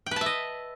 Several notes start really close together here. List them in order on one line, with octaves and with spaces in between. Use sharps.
G5 B4 A5 E5 D#5